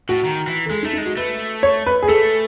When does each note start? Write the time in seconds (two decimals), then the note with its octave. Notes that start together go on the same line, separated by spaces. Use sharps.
0.09 A2 F#4
0.25 D#3
0.47 E3
0.66 A4
0.70 G#3 G#4
0.83 A3 D#4
0.93 D#4
0.98 G#3
1.06 F#4
1.17 A3 B4
1.63 C#5
1.86 B4
2.02 G#4
2.08 A3 A4